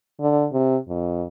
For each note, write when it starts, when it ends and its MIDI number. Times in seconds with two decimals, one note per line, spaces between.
0.20 0.46 50
0.53 0.76 48
0.88 1.25 41